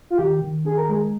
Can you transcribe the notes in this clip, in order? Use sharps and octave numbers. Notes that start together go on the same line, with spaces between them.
F4
D#3 G4
D#3
D4 G#4
A#4
G#3 G#4